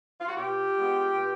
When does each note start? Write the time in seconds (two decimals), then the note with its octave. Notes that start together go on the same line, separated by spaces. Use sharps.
0.20 F4
0.28 F#4
0.36 B2 F4 G4
0.76 G#3 B3
1.15 B2